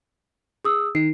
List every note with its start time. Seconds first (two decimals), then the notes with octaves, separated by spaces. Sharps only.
0.65 G#4 D#6 E6
0.95 D#3 C7